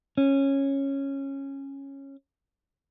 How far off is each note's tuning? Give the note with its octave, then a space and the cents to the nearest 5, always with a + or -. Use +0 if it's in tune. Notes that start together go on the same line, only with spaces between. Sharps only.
C#4 -10